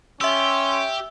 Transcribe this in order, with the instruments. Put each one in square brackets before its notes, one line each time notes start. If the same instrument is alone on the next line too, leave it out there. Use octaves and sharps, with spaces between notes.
[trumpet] C#4 [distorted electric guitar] G4 [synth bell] E5 E6 [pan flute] C6